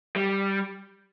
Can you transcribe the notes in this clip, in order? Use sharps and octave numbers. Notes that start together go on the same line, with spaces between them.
G3